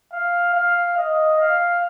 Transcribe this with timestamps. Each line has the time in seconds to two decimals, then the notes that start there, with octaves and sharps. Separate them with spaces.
0.13 F5
0.54 F5
0.97 D#5
1.40 F5